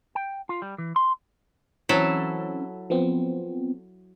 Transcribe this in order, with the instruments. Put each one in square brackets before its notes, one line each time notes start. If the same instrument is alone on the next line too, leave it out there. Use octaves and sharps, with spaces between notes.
[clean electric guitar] G5
F4
G3
E3
C6
[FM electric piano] E3 C4 C#4 [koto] F#3 E4 A4
[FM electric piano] F3 B3 C4